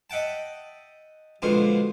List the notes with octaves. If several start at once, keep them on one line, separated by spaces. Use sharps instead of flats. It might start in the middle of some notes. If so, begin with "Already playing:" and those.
D#5 E5 F#5 G5 A5
A#1 B2 D3 G#3 C4 F4